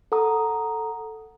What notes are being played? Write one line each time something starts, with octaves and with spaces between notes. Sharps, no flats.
A4 F#5 A#5 D#6